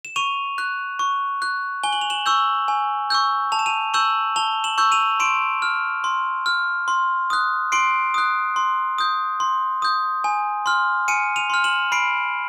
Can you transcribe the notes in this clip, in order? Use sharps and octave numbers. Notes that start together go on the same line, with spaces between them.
E7
C#6 D#7 F7
F#6
C#6
F#6
G#5 G7
F#7
F7
E7 F#7
C#6 E6 G6
G#5
C#6 E6 G6
A5 F7
E7
D#7 F7
C#6 E6 G6 E7 F#7
A5 F7 G7
E7 F#7
C#6 E6 G6
D#7 F7
C6 D7 E7
F6
C6
F6
C6
D#6 F#6
C6 C7 D7
D#6 F#6
C6
D#6 G6
C6
D#6 G6
G#5
C6 F6
G#5 C#7 D#7
D#7 F7
C6 F6
E7 F#7
B5 C7 D7